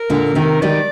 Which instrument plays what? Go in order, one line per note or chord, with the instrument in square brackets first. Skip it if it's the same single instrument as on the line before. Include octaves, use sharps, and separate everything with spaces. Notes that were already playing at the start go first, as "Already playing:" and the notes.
Already playing: [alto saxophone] A#4
[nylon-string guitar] A#2 D3
C3 D#3
[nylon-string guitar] D#3 G3 [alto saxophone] D5